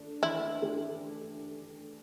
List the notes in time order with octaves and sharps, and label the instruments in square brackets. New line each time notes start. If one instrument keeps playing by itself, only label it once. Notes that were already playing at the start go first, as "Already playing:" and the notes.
Already playing: [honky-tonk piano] A3 D4
[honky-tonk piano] E3 [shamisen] E4
[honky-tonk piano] A3 D4 G4